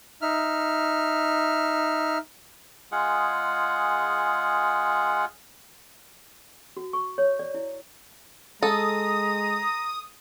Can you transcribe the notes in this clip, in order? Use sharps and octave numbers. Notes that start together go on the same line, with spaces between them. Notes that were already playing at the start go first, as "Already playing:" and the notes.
D#4 E5 F6
G#3 F4 G#4 F#5
F#4
C#6
C#5
D5
E4
G#3 A4 A#5 D#6